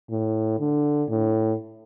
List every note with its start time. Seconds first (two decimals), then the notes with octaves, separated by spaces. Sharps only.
0.10 A2
0.60 D3
1.09 A2